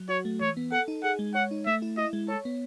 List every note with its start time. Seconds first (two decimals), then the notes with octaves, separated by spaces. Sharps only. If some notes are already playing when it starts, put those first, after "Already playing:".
Already playing: F#3
0.09 F#4 C#5
0.25 A3
0.41 E3 C#5
0.57 B3
0.72 A4 F#5
0.88 D#4
1.03 G#4 F#5
1.19 G#3
1.34 C#5 F#5
1.51 D#4
1.66 A3 E5
1.82 E4
1.97 E4 D#5
2.13 G#3
2.28 A4 C#5
2.45 B3